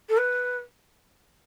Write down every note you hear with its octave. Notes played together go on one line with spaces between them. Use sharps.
A4
B4